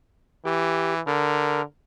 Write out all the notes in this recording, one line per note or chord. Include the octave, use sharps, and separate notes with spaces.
E3 G4
D3 A#4